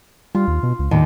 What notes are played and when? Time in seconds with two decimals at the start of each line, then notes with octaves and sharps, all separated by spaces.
0.35 G3 F4
0.48 D#2
0.63 B2
0.79 C#2
0.91 D#2 A2 D#3